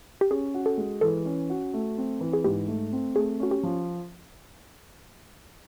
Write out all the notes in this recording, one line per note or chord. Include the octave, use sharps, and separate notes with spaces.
G4
C#4 G#4
F#4
A4
G#3
E3 A4
C#4
F#4
A3
C4
E3
G#4
G#2 G4
A3
C4
A3 G#4
C#4 F#4
G4
F3